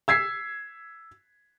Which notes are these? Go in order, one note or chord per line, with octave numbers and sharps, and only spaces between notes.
E6 G#6 B6 C7